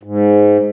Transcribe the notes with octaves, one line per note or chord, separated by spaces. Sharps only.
G#2